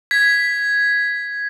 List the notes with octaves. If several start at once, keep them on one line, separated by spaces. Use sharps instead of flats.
G#6 B6